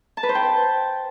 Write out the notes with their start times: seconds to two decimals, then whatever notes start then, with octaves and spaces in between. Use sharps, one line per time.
0.17 A5
0.23 B4
0.29 C5
0.35 G5